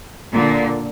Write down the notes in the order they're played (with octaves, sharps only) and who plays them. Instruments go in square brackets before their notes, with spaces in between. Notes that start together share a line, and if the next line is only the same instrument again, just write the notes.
[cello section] A#2 D3